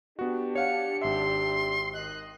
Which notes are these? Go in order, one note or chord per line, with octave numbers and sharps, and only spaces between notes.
B3 D4 F#4 G4
C#5 F5 F#5 C#7
G#1 E5 C6
D#3 D#5 F#6